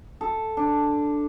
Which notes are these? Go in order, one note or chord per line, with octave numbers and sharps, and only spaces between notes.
A4
D4